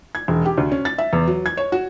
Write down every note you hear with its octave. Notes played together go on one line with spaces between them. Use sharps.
G#6
E1
G4
D2
C#4
A6
E5
E2
F#3
G#6
C#5
F#4